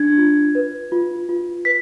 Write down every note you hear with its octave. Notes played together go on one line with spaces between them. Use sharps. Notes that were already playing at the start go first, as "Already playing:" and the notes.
Already playing: D4 G#6
F4
B4
F4
F4
B4 B6